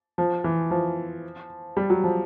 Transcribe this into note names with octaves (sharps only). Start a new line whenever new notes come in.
F3
E3
F3
G3
F#3
F3